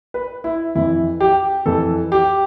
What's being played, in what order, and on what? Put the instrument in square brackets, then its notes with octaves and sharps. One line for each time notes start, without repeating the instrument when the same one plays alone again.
[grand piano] B4
E4
F2 E3 E4
G4
F2 E3 A4
G4